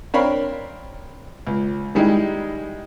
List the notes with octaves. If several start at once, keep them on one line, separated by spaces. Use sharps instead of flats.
C4 D4 A#4 C#5 F5 B5
C#2
D#3 G3 G#3 D#4 E4